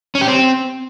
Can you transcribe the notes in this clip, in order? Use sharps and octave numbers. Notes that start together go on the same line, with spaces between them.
C#4
G4
C4